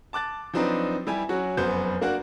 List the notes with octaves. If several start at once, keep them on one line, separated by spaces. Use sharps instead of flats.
A5 D6 F#6 A6
F3 F#3 C4 D4 D#4 B4
G3 E4 G4 G#5
F#3 C#4 F#4
F1 F#2 B3 C5 G6
A#3 D4 F#4 A#4 F#5